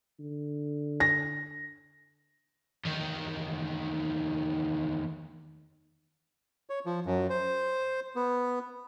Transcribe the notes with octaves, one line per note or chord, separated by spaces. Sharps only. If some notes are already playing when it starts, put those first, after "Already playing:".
D3
A#6
E2 D#3
C#5
F3
F#2
C5
B3